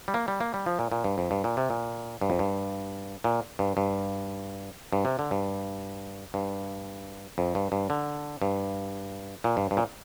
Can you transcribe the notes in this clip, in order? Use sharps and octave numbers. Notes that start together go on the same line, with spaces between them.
G3
A#3
G3
A#3
G3
F3
A#2
A#2
G2
F2
G2
A#2
C3
A#2
G2
F2
G2
A#2
G2
G2
G2
C3
D3
G2
G2
F2
G2
G2
D3
G2
A#2
G2
G2
A#2